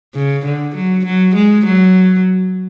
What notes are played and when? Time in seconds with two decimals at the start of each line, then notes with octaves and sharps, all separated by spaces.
0.15 C#3
0.45 D3
0.75 F#3
1.05 F#3
1.35 G#3
1.65 F#3